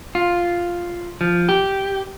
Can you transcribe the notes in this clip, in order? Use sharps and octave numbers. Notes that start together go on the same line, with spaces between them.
F4
F3
G4